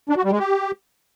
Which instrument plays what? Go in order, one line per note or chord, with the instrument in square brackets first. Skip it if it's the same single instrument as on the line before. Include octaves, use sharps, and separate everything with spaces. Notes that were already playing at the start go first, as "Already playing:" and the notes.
[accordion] D4
F#4
G3
G#3
G4